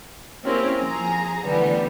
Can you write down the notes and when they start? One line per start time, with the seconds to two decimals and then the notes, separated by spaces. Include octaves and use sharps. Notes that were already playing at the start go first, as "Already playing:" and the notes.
0.43 A#3 C4 C#4 E4 G4 A#4
0.79 F3 G#4 A#5
1.45 D3 E3 G3 A3 B3